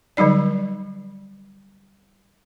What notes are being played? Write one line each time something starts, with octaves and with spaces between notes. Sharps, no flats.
D3 F#3 G3 D#4 D5